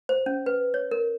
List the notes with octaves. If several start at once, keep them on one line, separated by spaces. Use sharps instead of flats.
C5
C#4
B4
C#5
A#4